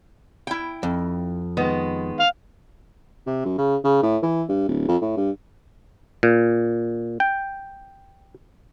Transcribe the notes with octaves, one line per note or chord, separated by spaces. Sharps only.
E4 G5
F2
D#3 G#3 B3
F5
C3
F#2
C#3
C#3
A2
E3
G2
D1
F2
A2
G2
A#2
G5